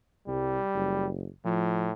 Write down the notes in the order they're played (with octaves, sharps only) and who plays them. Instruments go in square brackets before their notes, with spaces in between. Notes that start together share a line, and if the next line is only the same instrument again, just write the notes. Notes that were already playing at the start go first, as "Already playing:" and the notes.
[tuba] C2 [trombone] G3
[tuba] F#1
[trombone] A2 [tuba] F3